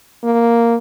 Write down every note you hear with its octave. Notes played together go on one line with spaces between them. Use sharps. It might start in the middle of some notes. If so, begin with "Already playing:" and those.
A#3